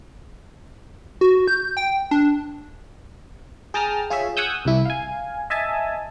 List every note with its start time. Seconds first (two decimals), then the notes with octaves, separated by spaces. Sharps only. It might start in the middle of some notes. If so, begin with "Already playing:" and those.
1.21 F#4
1.47 G6
1.77 G5
2.11 D4
3.74 G#4 G5 A5 A#5 D#6 F6
4.10 F4 G#4 C#5 E5
4.37 F#5 G#5 C#6 D#6 E6 G6
4.65 C2 E4
4.85 F5 G#5
5.50 D#5 E5 G#5 A5